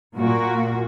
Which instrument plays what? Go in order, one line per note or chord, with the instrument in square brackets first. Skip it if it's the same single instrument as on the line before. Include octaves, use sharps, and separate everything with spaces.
[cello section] A#2 A#3 F#4